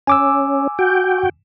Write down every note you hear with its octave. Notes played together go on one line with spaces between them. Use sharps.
C#4 G#5 D6 E6
F#4 G5